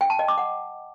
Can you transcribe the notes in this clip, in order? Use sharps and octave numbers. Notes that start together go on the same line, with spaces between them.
G5
A5
D#5
D6
F#5